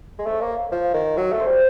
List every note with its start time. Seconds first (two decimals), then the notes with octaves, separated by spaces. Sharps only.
0.19 G#3
0.26 A3 C#5
0.41 A#3
0.72 F3
0.94 D#3
1.17 F#3
1.32 A3
1.40 C5
1.47 G3